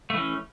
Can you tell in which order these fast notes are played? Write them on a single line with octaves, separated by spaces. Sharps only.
A3 E3 C#4